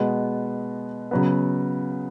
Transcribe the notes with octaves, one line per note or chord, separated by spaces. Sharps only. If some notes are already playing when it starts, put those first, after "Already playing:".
Already playing: B2 G#3 B3
C#3 F#3 B3